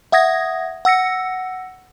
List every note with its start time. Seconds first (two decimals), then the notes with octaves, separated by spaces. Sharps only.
0.12 E5 F#5 D#6 G#6 A#6
0.85 F#5 E6 A#6 C#7